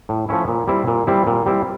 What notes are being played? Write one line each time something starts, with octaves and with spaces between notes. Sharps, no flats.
A2
F3 A3 C#4 E4
A#2
G3 C4 E4
A#2
G3 C4 E4
A#2
G3 C4 E4